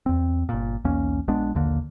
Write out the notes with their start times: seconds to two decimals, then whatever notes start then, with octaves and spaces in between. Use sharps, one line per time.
0.06 E2 C4
0.49 G1 A#2
0.85 B1 E2 A#3 C#4
1.28 A#1 G#3 B3 D4
1.55 A#1 D#2 D3 A#3